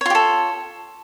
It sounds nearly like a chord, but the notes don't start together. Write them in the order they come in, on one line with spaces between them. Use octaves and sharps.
C#5 F4 G4 A4